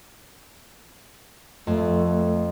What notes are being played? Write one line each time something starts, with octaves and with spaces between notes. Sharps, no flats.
F2 A3